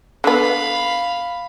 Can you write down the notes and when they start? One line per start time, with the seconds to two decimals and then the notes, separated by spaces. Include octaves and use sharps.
0.24 D3 B3 F5 B5